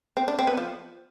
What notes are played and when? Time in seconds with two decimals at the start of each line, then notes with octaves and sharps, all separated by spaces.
0.17 C4
0.28 D4
0.39 C4
0.47 B3
0.57 F3